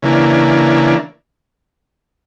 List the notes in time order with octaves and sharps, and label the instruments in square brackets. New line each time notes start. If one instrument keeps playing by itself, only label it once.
[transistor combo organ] C#3 E3 A#3 D4